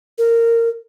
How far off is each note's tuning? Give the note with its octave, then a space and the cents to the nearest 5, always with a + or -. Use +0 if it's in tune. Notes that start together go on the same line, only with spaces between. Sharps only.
A#4 -15